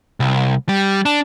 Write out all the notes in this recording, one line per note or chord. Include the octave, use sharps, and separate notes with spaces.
C2
G3
D4